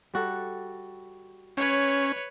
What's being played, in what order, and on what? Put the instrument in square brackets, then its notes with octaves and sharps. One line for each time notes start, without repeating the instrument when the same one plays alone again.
[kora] G3 F#4 A4
[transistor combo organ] C#4 [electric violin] B4 C#5